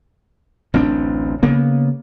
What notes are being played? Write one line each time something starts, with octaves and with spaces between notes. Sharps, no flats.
A1 D2 C4 D4
C#3 A#3 B3